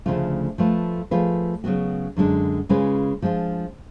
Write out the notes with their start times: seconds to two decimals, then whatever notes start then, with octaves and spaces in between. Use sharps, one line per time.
0.06 D2 C#3 F3 A3 F4
0.58 F3 A3 F4 B4
1.11 F3 A3 F4 G#4 B4
1.64 C#3 F#3 B3 F#4
2.17 F#2 D3 G#3 D4
2.69 C#3 G#3 C#4 F4 B4
3.22 F3 G#3 D4 F4